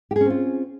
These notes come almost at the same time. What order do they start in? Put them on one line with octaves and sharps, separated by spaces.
G4 G#4 C#4 C4 F4